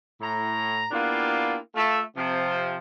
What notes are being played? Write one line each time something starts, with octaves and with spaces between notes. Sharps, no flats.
A2 A#5
A#3 B3 D4 E4 F4 G4
A3 F4 E5
C3 F3